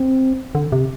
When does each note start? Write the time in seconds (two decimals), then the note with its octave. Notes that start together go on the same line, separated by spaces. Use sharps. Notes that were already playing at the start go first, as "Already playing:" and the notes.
Already playing: C4
0.55 D3
0.72 C3